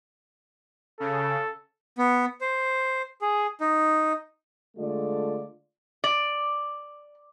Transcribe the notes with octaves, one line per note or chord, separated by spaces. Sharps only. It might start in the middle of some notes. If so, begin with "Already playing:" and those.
C#3 A4
B3
C5
G#4
D#4
D3 G#3 A3 F4 D5
D5